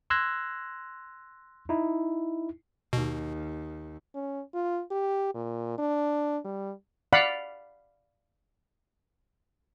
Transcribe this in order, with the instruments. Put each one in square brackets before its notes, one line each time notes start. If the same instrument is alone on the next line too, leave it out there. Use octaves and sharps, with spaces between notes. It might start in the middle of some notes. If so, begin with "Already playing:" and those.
[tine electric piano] C6 E6 F#6 G#6 A#6
D#4 E4
[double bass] D#2 [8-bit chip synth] B2
[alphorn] C#4
F4
G4
A#2
D4
G3
[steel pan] D5 F5 F#5 B5